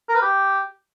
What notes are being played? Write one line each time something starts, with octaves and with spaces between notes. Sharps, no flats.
A#4
B4
G4